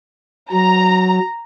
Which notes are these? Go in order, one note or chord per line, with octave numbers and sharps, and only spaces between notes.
F#3 A#5